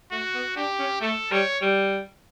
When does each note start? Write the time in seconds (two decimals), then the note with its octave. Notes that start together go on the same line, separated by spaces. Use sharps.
0.12 A3 F#4
0.34 B3
0.56 D4 G4
0.79 C#4
1.01 A3 A4
1.31 G3 C#5
1.61 G3